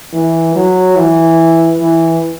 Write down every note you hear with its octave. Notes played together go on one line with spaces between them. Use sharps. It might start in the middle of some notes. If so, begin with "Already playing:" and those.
E3
F#3
E3
E3